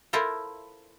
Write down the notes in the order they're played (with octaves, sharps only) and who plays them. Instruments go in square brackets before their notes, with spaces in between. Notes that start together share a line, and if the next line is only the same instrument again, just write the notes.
[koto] E4 F4 A4 A#4 C5